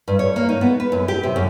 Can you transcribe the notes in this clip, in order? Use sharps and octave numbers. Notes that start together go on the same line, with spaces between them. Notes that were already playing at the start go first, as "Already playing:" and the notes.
G2
C#5
A#3
D#4
B3
B4
F#2
G4
C3
F#2